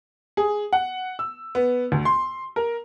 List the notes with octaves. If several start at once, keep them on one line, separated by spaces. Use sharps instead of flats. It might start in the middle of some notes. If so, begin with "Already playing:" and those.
G#4
F#5
E6
B3
D2
C6
A#4